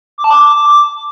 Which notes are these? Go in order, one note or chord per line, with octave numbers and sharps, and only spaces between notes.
D6
A5
D6